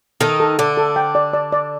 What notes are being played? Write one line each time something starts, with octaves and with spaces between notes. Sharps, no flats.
D#3 D#4 A4
A4
D3 D4 A4
A4
G5
D5
D5
D5